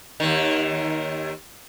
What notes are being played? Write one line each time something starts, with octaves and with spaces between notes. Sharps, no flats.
D#2 D#3